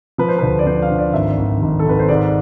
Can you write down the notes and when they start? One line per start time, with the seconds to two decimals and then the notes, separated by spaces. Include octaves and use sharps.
0.18 F3 B4
0.28 C5
0.39 D2 B4
0.59 D5
0.66 F3 C5
0.82 F5
0.90 D3
0.99 D5
1.14 G#1 E5
1.38 G#1
1.62 G#1
1.79 A4
1.86 G#1 B4
1.99 C5
2.09 G#2 D5